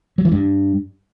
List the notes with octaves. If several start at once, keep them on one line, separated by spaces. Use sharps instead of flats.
F#3
E3
G2